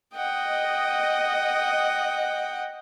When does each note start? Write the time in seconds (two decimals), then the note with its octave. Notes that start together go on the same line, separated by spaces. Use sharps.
0.15 D#5 F#5 G5